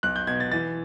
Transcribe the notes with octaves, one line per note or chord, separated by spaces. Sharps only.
B1 F#6
G6
B2 G#6
A6
E3 A6